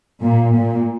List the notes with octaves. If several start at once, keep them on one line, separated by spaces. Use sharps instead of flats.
A#2
A#2